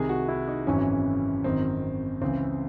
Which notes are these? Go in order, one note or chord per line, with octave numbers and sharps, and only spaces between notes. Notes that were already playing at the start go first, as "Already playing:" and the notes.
Already playing: C2 C3 D#3 G#4
F#4
E4
D#4
G#1 F#2 C#3 E3 C#4
G#1 F#2 D#3 C4
C#2 C#3 E3 C4